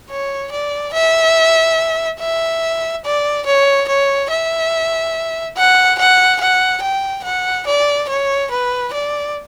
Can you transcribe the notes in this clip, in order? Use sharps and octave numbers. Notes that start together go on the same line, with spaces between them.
C#5
D5
E5
E5
D5
C#5
C#5
E5
F#5
F#5
F#5
G5
F#5
D5
C#5
B4
D5